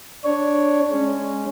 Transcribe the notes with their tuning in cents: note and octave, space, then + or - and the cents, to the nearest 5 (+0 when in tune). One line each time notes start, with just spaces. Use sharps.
D4 +0 C#5 +0
G#3 +5 C#4 +0